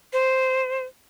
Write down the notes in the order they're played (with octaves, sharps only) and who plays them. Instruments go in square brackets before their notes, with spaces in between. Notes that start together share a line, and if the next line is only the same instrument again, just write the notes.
[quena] C5